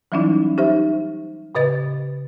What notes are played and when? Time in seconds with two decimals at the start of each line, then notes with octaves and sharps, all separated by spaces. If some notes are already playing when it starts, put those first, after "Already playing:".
0.12 E3 F#3 G3 C#4 D#4 E4
0.58 D#4 G4 C5 E5
1.55 A2 C#3 B4 D#5 A6